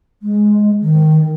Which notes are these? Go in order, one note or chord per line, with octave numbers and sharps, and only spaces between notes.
G#3
D#3